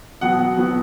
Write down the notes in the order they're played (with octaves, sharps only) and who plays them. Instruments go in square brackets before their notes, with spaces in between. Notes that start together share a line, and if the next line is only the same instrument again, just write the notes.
[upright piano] B2 F#3 B3 F#5
B2 F#3 B3